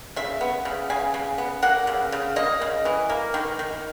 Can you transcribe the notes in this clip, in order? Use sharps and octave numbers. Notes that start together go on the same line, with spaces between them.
C#3 E5
B3
C#3
C#3 G#5
C#3
B3
A#3 F#5
C#3
C#3
A#3 D#5
C#3
E3
A#3
D#3
D#3